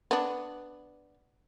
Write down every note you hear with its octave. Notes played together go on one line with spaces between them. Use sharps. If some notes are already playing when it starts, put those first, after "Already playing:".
B3 D4